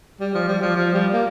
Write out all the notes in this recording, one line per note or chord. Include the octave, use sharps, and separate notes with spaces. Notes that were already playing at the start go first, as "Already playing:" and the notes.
G3
F3
G3
F3
F3
G3
A#3